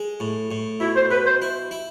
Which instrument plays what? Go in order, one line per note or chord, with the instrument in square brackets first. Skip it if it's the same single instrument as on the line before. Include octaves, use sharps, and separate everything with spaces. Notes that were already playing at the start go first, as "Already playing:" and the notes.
Already playing: [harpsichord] G#3
A2
A2
[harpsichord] B2 [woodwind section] E4
[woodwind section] C5
[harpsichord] B2 [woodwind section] B4
[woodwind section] C5
[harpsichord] E4
E4